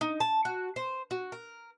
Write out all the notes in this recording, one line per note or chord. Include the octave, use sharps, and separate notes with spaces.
D#4
A5
F#4
C5
F#4
A#4